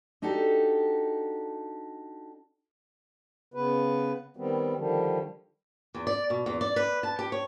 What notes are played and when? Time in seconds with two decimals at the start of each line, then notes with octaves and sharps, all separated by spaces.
0.22 D4 D#4 F#4 G4 A4
3.54 C#3 B3 B4
4.37 D#3 G3 B3 C4
4.76 D3 D#3 F3 G3
5.95 E2
6.07 D5
6.30 B2
6.46 E2
6.61 D5
6.76 B4
7.03 A5
7.19 G4
7.32 C#5